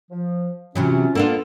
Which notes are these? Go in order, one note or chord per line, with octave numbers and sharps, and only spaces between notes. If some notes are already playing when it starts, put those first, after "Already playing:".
F3
C3 E3 F#3 C#4 F4
A#3 B3 D4 F4 A4 E6